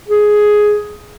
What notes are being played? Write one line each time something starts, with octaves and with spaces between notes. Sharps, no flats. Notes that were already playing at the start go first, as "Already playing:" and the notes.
G#4